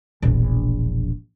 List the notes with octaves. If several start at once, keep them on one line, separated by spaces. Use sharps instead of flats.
E1 A#1